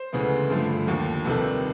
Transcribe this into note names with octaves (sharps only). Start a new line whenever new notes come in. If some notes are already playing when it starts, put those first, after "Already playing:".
Already playing: C5
D2 C#3 E3 G#3 B3
G2 D3 F3 A3
D#2 D3 F3
C2 C3 D#3 A4 B4